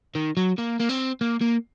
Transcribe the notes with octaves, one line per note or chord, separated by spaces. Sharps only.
D#3
F#3
A#3
A#3
C4
A#3
A#3